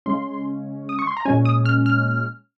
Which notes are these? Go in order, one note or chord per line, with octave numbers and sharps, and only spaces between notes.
C#3 G#3 C#4 C6
D#6
C#6
C6
A#5
A#2 G#3 C#4 G#5
D#6
F6
F6